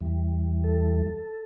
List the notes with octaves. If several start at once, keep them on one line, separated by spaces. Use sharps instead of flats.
E2 E3 G3
A4